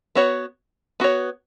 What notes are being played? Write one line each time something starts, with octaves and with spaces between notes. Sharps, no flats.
B3 F#4 C#5
B3 F#4 C#5